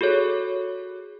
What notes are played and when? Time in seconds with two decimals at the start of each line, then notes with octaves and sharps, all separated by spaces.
0.01 F#4 G#4 A4 C#5